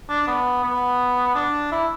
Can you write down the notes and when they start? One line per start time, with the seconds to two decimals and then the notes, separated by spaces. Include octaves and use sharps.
0.10 D4
0.28 B3
0.64 B3
1.35 D4
1.72 E4